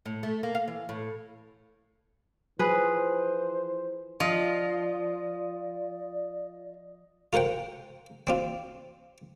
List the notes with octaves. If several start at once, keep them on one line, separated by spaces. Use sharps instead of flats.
A2
A3
A#3
F5
E3
A2
E3 F3 G#4 B4 C5
F3 F4 D5 D#5
F4 A#4 C5 F#5 G5
C4 D4 F4